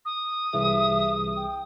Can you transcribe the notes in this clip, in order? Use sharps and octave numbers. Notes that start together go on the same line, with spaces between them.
D#6
C2 E3 G#4 E5
G5